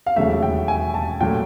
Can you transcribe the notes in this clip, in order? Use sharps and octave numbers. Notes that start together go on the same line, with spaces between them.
F5
E1 D#2 C#3 F#3 A3 E5
G5
G#5
A5
A#2 F#3 A3 G5